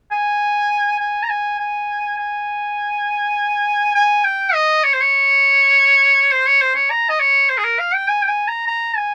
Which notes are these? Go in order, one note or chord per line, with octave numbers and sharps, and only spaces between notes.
G#5
G#5
A#5
G#5
G#5
G#5
G#5
G5
D#5
C#5
C5
C#5
C5
C#5
C5
C#5
A#5
D#5
C#5
C5
G#4
A#4
F5
G5
G#5
G5
G#5
A#5
A#5
G#5